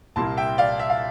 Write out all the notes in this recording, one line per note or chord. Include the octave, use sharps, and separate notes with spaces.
C2 A#2 G3 A#3 E4 A5 C6
E5 G5
D5 F5
E5
F5